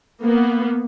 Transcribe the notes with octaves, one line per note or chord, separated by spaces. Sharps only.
A#3 B3